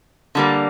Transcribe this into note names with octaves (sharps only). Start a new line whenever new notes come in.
D3 G3 A#3